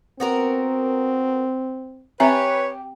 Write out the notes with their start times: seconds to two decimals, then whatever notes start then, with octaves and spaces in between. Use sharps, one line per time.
0.20 B3 C4 F#4 A#4
2.20 C4 G4 B4 C#5 E5 A#5